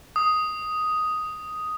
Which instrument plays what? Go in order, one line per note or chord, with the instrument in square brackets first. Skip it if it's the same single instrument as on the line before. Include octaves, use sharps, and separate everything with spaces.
[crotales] D#6